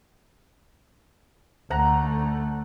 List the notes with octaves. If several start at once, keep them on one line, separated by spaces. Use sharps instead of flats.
D2 A3 F#5 A#5